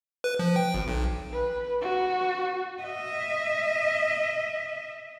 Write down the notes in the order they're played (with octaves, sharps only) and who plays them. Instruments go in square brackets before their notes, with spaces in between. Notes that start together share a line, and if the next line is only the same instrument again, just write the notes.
[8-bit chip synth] B4
F3
G5
G#1
B1
[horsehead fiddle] B4
F#4
[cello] D#5 E5